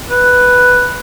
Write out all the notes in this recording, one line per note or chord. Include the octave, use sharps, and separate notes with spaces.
B4